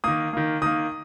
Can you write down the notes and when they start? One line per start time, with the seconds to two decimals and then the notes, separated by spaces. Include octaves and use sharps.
0.04 D#3 A#3 D#6
0.33 D#3 A#3
0.62 D#3 A#3 D#6